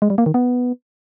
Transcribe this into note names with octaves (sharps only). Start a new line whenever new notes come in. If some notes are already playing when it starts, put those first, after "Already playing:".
G#3
G3
A#3
D#3
B3